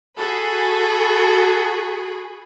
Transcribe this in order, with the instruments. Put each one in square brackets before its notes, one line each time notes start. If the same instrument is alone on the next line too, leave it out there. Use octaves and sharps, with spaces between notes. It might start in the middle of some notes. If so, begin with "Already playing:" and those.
[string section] F#4 G#4 B5 [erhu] A4